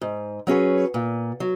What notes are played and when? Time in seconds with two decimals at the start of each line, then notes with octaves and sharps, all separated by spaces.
0.01 G#2
0.47 F#3 C#4 G#4 B4
0.94 A#2
1.40 F#3